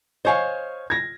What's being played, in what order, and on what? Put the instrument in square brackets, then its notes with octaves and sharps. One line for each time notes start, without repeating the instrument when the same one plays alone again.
[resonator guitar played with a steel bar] C5 C#5 F5 [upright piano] D#5 G#5
[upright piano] G#6 A#6